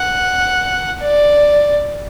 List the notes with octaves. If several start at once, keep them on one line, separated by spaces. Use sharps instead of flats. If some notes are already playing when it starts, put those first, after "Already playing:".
Already playing: F#5
D5